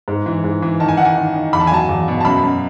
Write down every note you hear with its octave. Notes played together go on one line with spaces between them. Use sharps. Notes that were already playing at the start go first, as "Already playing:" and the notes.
G#2
E3
G#2
E3
D#3 A5
G#5
D#3 F#5
G#5
D#3
D#3
E2 B5
A5
G#5
F#3 A5
E2
B2
A5
F#2 B5
F#2